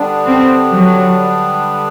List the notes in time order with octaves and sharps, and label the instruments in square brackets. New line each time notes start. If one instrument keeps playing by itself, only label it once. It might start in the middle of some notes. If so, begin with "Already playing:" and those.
Already playing: [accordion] D3 G3 B3 D4
[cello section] C4
F#3